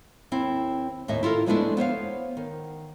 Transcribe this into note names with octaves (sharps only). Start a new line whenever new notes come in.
D#2 C4 E4
D#2 A2 D#5 E5
E4 F4 A4 A#4
F3 G#3 A3 B3 D4 E4
B3 C5 C#5 F5
D#3